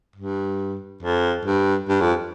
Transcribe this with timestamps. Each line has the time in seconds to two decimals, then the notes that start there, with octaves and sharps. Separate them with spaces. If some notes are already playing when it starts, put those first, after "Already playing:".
0.16 G2
1.02 F2
1.45 G2
1.89 G2
2.01 F2